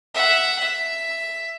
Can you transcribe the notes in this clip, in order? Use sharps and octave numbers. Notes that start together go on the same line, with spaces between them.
E5 F#5
E5